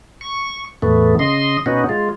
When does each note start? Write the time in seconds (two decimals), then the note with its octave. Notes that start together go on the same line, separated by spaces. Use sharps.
0.21 C#6
0.82 E2 A2 A3 B3
1.19 C#3 D#5 C6
1.66 B2 B3 C#4 D#4 F#4
1.89 G#3 F4